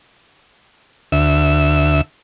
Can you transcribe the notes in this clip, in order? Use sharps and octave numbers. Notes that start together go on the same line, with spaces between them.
D2 E5